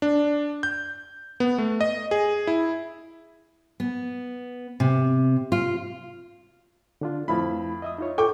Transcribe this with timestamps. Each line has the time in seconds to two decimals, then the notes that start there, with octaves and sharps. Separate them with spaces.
0.02 D4
0.63 G6
1.40 B3
1.58 A3
1.81 D#5
2.11 G#4
2.47 E4
3.80 B3
4.80 C3
5.52 F4
7.01 D3 D4 F4
7.28 F2 A3 E4 F5 B5
7.82 D#5 E5 D#6
7.98 D#4 F4 C#5
8.18 A4 G5 C#6 D6